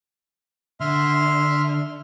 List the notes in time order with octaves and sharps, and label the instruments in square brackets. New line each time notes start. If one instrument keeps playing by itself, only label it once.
[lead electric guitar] D3 [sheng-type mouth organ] E5 C6 F6